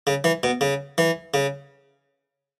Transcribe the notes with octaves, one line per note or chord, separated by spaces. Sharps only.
C#3
E3
B2
C#3
E3
C#3